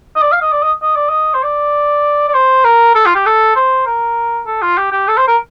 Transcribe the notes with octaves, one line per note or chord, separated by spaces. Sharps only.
D#5
D5
F5
D#5
D5
D#5
D#5
D5
D#5
C5
D5
D5
C5
A#4
A4
F4
G4
A4
C5
A#4
A4
F4
G4
G4
A4
C5
A#4